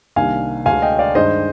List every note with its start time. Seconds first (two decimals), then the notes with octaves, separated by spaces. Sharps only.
0.16 C2 C3 D#3 A#3 D4 F5 G#5
0.66 D2 D3 G#3 F5 G#5
0.82 D#5 G5
0.99 D5 F5
1.15 G2 D#3 G#3 C5 D#5